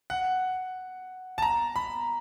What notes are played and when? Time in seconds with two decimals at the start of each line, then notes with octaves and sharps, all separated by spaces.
0.10 F#5
1.38 A5
1.42 A#5
1.76 B5